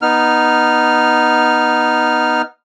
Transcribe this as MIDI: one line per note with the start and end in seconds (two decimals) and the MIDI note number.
0.02 2.42 59
0.02 2.42 63
0.02 2.42 89